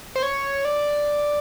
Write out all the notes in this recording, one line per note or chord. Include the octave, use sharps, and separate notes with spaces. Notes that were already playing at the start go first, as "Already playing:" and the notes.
C5
C#5
D5